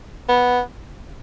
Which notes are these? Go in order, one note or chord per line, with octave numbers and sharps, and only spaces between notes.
B3